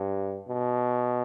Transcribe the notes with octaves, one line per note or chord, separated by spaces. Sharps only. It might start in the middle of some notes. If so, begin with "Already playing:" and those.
Already playing: G2
B2